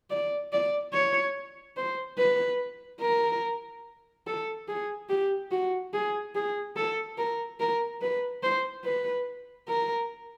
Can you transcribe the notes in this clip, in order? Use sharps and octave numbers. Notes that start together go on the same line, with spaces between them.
D5
D5
C#5
C5
B4
A#4
A4
G#4
G4
F#4
G#4
G#4
A4
A#4
A#4
B4
C5
B4
A#4